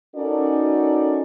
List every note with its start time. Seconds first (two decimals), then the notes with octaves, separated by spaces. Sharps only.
0.15 C#4 D#4 F#4 A4 A#4 D5